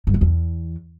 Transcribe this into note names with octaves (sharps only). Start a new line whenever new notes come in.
G2
F2
E2